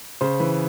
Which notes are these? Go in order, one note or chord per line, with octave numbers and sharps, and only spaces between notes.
C#3 C5
E3 B4